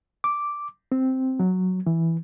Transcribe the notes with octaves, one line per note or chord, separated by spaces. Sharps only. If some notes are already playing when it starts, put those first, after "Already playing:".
D6
C4
F#3
E3